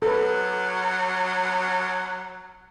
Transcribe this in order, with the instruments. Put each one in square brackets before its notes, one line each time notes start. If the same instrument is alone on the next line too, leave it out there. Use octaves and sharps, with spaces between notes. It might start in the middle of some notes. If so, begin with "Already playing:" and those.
[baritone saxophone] F#3 [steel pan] A4 B4